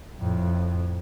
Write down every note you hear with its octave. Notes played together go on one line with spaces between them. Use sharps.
F2 A2